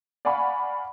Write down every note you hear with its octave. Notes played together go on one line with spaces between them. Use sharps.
D5 F5 F#5 G#5 B5 C#6